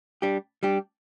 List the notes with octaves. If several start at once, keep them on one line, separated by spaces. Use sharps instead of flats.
G3 D4 G4
G3 D4 G4